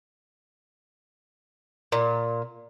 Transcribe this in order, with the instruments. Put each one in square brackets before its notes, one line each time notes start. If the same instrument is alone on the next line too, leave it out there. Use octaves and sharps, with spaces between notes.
[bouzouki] A#2